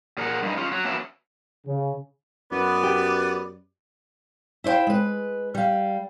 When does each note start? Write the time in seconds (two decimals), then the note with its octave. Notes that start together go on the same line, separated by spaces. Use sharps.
0.18 A#2 G#4 A#4 C5 F#5
0.43 G2 D#4
0.57 C#4 F4
0.72 F#3
0.85 A#3 B3 C#4 D4 F#4 E5
1.66 C#3
2.52 F#2 B3 D5
2.84 G4
4.64 E4 C5 D5 F5 G5
4.87 G#3 B4
5.55 G3 F5